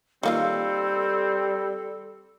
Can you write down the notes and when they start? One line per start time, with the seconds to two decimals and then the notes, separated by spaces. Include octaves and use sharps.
0.23 D#3 G3 A#3 C4 F4 A4